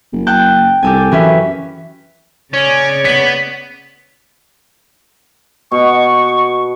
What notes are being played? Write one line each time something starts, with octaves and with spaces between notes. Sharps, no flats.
F#1
G5 A5 F#6
C2 G4 A4 G#5
F#2 E3 C#4 E5
C#3 C#4 C#5 D5
B3 B6 F#7
B2 C#6